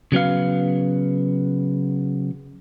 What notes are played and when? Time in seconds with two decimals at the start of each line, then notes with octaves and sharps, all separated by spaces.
0.12 C#3 F#3 B3 F5